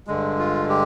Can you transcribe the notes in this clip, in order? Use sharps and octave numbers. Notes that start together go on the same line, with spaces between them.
G2 D3 G#3
F4
G4